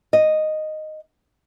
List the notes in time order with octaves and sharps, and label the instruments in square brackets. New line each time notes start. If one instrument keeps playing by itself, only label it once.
[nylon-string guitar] D#5